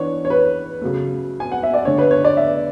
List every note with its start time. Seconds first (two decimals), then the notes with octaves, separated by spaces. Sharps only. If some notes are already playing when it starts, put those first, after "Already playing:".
Already playing: E3 B3 D4 C#5
0.25 C#5
0.30 B4
0.81 C#3 F#3 A3
1.40 G#5
1.52 F#5
1.63 E5
1.74 D5
1.85 D3 A3 D4 C#5
1.98 B4
2.11 C#5
2.24 D5
2.37 E5